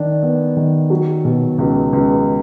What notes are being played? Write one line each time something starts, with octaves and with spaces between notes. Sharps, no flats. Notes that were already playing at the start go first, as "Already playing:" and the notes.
Already playing: D#3 D4
B3
D#3
F#3
B2
C#2
C#2